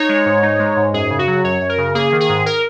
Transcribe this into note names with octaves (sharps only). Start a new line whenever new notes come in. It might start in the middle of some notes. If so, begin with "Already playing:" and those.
Already playing: D#4 C#5
G#3
G#2
D#4
G#3
G#2
F#2 G#4
C#3
F#4
F#3
F#2 C#5
F#2
A#4
C#3
A#3 G#4
D#3
G#4
G#2
A#4